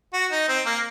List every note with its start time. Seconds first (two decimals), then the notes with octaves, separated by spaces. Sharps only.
0.13 F#4
0.31 D#4
0.49 C4
0.66 A#3